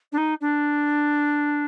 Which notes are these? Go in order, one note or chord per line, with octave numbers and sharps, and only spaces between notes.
D4
D#4
D4